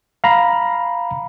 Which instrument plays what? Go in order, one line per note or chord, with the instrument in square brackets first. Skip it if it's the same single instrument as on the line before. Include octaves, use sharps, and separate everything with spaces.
[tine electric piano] F5 A#5 B5